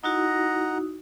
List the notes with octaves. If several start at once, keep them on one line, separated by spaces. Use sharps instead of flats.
D#4 E4 F#4 D#5 F#5 A#5